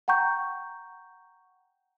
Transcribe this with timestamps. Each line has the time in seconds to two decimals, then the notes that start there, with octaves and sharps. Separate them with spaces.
0.08 F#5 G5 A#5 C#6 G6